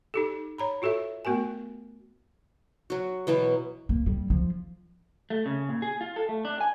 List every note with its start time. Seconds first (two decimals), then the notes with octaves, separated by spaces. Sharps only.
0.14 D#4 G4 A4
0.58 C#5 A#5 B5
0.82 F4 F#4 A4 C#5 E5
1.25 A3 B3 F#4 A#4 G#5
2.90 F#3 F#4
3.27 B2 E3 F#3 B3
3.89 A#3
4.06 G3
4.30 F3
5.30 A3
5.46 C#3
5.69 A#2
5.82 G#4
6.01 F4
6.16 A4
6.29 A3
6.45 D4
6.61 G#5